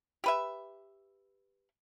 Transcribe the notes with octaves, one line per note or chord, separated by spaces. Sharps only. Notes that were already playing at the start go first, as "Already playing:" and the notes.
G4 B4 E5